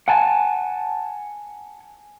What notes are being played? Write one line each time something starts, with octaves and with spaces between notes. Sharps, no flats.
F#5 G#5 A5